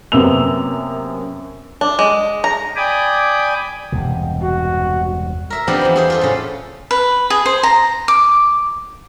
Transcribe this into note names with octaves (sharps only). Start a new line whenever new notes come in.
F#2 C3 A#3 B3 E6 F7
D4
G#3
A#5
D5 G5 G#5 B5 D6 D#6
E1 G2 C3
F#4
A#4 E5
F3 G3 B3 C4 D4 D#4
E2 B5
E4 G#4 C5
F4 G#4 A4
A2 C#3
B4
G#4
C5
A#5
D6